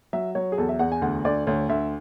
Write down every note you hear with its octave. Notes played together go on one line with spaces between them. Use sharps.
F#3 E5
F#3 C#5
G#4
E2 A4
E5
E2 F#5
G#5
D2 F#5
D2 D5
D2 C#5
D2 E5